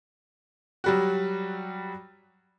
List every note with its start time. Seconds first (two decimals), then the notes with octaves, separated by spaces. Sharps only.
0.84 F#3 G3 F#4